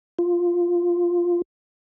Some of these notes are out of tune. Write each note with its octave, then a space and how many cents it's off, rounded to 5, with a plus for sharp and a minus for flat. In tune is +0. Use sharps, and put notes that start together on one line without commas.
F4 +0